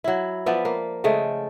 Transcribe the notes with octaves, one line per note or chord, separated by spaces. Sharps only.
F#3 E4
F3 B3 D5 E5
A#3
C#3 G#3 A3 G5